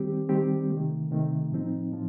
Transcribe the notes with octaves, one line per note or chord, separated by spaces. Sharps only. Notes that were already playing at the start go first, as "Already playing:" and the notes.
Already playing: D#3 G3 C4 G4
D#3 G3 C4 G4
C3 D#3 A3
C3 D#3 A3
A2 F3 C4 D#4
A2 F3